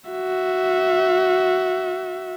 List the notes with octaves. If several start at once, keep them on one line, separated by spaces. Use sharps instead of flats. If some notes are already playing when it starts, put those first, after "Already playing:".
F#4 E5